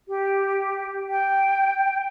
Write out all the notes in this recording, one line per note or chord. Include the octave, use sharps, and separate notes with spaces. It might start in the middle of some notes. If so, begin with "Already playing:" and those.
G4
G5